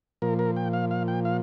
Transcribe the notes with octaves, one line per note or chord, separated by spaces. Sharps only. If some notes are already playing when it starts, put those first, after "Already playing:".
A#2 F3 A#4
A#4
G5
F5
F5
G5
F5